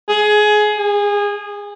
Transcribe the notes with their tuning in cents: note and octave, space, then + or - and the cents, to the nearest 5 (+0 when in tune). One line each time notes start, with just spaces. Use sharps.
G#4 +20
G#4 -25